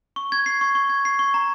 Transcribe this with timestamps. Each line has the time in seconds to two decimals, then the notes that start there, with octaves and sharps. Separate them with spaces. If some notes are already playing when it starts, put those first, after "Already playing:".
0.16 C#6
0.32 G#6
0.46 C7
0.61 C#6
0.75 C#6
0.90 G#6
1.05 C7
1.19 C#6
1.34 A#5